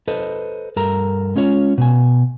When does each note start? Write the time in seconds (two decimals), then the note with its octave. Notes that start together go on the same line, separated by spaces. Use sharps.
0.08 A4 B4 C5 D#5
0.76 G2 A4 A#4 A#5
1.36 G#3 C#4 F4 C#5
1.78 B2 G#5